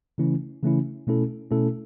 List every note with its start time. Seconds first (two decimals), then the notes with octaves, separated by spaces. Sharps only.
0.18 C#3 E3 A3 C#4 E4
0.63 C#3 E3 A3 C#4 E4
1.07 B2 A3 C#4 E4 A4
1.51 B2 A3 C#4 E4 A4